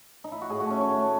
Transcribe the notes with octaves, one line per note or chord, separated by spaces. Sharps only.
D#4
E4
F#4
A2 G#4
F#4
A3 C#4
D#3 C#4
A3